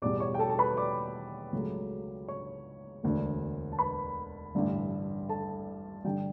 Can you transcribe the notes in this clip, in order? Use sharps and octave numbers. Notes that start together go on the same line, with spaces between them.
E2 B2 G3 D5 D6
C#5 C#6
G5
A4 A5
A5
B4 B5
D5 D6
C#2 C#3 F#3 A3
C#5 C#6
E1 D2 D3
A5
B4 B5
A1 G2 D3
A4 A5
G2 D3 G3 G4 G5